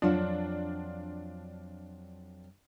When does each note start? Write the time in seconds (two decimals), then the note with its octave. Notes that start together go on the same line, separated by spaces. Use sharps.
0.02 F2 F#3 D4 F4 F#5